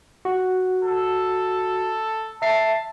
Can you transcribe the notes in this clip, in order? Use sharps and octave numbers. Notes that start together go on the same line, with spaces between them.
F#4
A4
E5 A5 C7